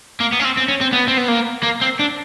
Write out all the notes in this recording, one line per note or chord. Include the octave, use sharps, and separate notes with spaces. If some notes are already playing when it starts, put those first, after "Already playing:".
A#3
B3
C#4
C4
C4
C#4
C4
B3
C4
B3
A#3
A#3
C4
D4